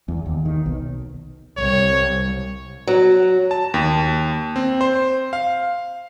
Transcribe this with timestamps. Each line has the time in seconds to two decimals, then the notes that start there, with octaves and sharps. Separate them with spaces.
0.08 E2
0.26 D#2
0.45 D#3
0.66 B1
1.58 C2 C#5
2.87 F#3
3.51 A5
3.74 D#2
4.56 C4
4.81 C5
5.33 F5